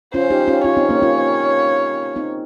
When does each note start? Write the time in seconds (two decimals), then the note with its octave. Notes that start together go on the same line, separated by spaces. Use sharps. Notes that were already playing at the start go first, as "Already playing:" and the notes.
0.14 C#4 F4 C5
0.30 D#4 G4
0.48 C#4 F4
0.64 C#4 F4 C#5
0.77 C4 D#4
0.89 A#3 C#4
1.02 C#4 F4
2.16 C4 D#4